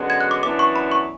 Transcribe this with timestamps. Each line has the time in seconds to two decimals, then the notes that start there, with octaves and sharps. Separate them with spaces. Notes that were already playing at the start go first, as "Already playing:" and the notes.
Already playing: F#2 D3 G#3 B3 F#4
0.10 G#6
0.21 F#6
0.31 D6
0.43 F#2 E3 B3 D4 D6
0.59 C#6
0.76 B5
0.92 C#6